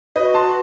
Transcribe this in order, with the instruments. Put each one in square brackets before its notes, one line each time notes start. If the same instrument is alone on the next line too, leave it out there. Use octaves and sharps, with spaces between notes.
[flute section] F#4 [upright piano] B4 D#5
[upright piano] A5 C6
[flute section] B4